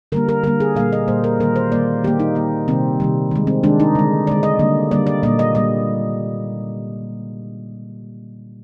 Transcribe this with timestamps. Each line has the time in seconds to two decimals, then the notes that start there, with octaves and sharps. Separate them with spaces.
0.12 D3 G3 A#3 A#4
0.29 A#4
0.44 D3 G3 A#3 A#4
0.60 G#4
0.76 A#2 G3 A#3 F5
0.93 D#5
1.08 A#2 G3 A#3 C5
1.24 A#4
1.40 D#3 G3 A#3 A#4
1.56 C5
1.72 D#3 G3 A#3 D5
2.04 D#3 G4
2.07 A#3
2.20 D#4
2.35 D#3 A#3
2.68 C3 D#3 G3 C4
3.00 C3 D#3 G3
3.31 D#3 G#3
3.47 C4
3.64 D#3 G#3 D4
3.80 D#4
3.95 D3 G#3
4.27 D3 G#3 D5
4.43 D#5
4.59 D3 G3 A#3
4.91 D3 G3 A#3 D5
5.07 D5
5.23 A#2 G3 A#3 D#5
5.39 D#5
5.55 A#2 G3 A#3 D#5